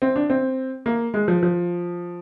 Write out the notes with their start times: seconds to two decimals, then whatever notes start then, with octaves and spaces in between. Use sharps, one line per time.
0.02 C4
0.16 D4
0.30 C4
0.86 A#3
1.14 G#3
1.28 F3
1.43 F3